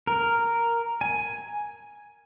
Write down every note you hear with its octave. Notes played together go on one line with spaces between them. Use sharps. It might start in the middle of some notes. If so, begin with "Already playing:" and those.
A#4
G#5